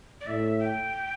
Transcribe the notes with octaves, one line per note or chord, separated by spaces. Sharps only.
D5
A2 E5
G5